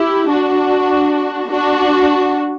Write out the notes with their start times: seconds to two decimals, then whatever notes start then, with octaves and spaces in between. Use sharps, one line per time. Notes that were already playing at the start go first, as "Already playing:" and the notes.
Already playing: E4 G4
0.28 D4 F#4
1.48 D4 F#4